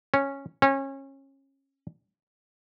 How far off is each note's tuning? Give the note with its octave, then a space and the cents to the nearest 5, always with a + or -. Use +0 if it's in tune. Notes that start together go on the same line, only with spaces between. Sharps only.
C#4 -10
C#4 -30